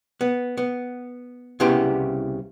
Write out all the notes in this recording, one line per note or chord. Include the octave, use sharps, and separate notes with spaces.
B3
B3
C2 C#3 B3 E4 G4 C6